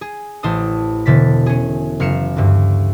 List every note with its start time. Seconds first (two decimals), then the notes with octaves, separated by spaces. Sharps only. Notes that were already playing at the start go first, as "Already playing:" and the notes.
0.01 G#4
0.43 A1 C5 A5 D#6
1.06 E1 B2 D3 A6 B6
1.46 C#4 G#4
2.00 F#1 F5 C#7 E7
2.36 D2 G2